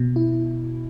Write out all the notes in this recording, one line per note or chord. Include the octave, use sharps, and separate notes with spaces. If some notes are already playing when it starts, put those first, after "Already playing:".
Already playing: B2
E4